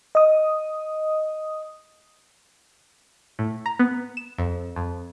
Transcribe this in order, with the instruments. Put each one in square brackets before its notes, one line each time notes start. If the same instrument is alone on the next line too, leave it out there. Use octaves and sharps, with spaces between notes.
[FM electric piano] D#5 D#6
[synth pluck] A2
A#5
B3
E7
F2
F2